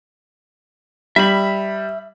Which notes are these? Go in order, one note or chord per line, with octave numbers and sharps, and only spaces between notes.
G3 E5 B5